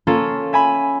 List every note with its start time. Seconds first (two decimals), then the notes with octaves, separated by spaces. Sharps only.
0.07 A#3 C#4 F4 A4
0.53 E5 G#5 B5